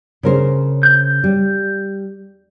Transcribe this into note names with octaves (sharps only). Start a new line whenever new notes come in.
C#3 A#4 C5
G6
G3